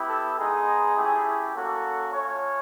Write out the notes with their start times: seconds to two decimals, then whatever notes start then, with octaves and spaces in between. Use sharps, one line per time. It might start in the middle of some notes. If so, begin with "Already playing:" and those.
Already playing: B3 E4 G4
0.08 A4
0.37 G#3 B3 D#4 G#4
0.95 A3 C#4 E4 G4
1.54 A#3 C#4 F#4 A4
2.12 A3 C#4 F4 C#5